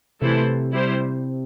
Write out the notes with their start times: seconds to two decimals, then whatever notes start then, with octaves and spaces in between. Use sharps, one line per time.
0.21 C3 E3 A3 E4 A4 C5
0.73 G3 E4 G4 C5